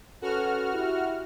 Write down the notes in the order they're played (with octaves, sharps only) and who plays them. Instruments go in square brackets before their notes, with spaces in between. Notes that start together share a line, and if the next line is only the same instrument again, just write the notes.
[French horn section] C#4 A4 B4 [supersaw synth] F#4 F6
[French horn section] E4 G4